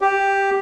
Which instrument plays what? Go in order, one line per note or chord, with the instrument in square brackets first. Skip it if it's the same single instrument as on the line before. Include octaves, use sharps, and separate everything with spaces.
[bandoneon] G4